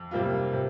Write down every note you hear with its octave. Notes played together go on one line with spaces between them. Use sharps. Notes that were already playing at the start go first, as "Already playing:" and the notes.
Already playing: F2
C3 G3 A#3 F4
C3